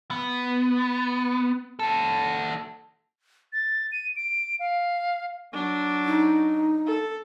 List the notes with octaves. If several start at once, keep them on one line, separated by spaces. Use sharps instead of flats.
B3
F#4 A4
A6
D#7
D7
F5
F#3 D4
D#4
A4